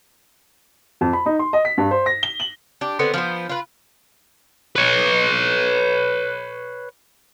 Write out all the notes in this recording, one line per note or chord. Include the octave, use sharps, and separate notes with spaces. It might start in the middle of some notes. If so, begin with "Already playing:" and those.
F2
B5
D#4
C6
D#5
B6
G2
C5
A#6
G7
F#7
D4 G4
D3 B3 C4
F3 B3 C5
F4 B4
B4 C#5